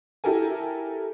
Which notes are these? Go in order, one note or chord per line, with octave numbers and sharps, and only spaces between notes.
E4 G4 A4 A#4 G#5